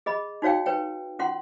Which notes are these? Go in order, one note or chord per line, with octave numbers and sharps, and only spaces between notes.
G#4 D#5 B5
D#4 F#4 C#5 F5 G5
B4 C#5 G5
C#4 F4 F#5 C6